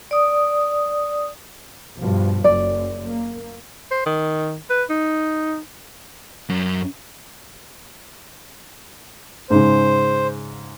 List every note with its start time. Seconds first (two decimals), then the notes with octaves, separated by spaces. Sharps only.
0.11 D5 D#6
1.99 G2 B2 F3
2.44 F#1 F#2 D5
3.04 A#3
3.91 C5
4.06 D#3
4.70 B4
4.90 D#4
6.50 F#2
9.50 G#2 C#3 C5